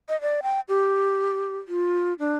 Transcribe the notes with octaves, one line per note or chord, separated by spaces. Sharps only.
D#5
D5
G5
G4
F4
D4